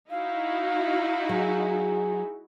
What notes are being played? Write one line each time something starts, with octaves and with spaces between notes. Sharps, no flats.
D#4 E4 F#4 F5
F#3 G#4